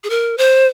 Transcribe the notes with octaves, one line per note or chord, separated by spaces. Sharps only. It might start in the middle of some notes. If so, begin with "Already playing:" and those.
G#4
A#4
C5